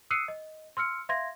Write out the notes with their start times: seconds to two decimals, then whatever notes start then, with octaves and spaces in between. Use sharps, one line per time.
0.10 D#6 E6 F#6 C7 C#7 D#7
0.28 D#5
0.77 C6 E6 F6 C#7
1.09 E5 F5 C6 G#6 A#6